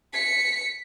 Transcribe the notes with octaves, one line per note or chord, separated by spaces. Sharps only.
B6 C#7